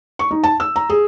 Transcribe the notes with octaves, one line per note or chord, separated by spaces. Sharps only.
C#6
D#4
A5
E6
A#5
G#4